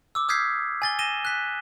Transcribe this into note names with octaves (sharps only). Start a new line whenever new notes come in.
D6 E6
D#6 F6 G6 G#6 B6 C7
G#5 A6 G7
A#6 D#7 E7 G7
F#6 B6